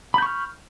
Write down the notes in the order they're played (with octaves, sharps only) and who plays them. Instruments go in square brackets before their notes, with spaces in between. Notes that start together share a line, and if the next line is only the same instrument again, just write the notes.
[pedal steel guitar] B5
G6
C#6
F6